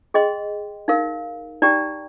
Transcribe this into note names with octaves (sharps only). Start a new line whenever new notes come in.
G#4 D#5 G5 C6
D#4 A#4 F5
D#4 G4 D5 G5 A#5